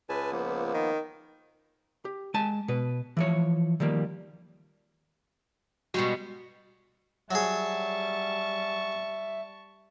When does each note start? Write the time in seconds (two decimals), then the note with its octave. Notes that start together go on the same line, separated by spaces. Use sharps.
0.09 C#2 B4 G#5 A5
0.31 F3 A#3 B3
0.74 D#3
2.05 G4
2.34 G#3 G#5 A5
2.68 B2 B4
3.17 E3 F3 C#5
3.80 D#3 F3 G3 A#3
5.94 B2 G3 G#3 F#4 C#6
7.31 F#3 G3 G#4 E5 A5 C#6